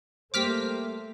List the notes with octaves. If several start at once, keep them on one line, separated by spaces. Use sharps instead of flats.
G3 A3 A#3 G4 C5 D6 F6 B6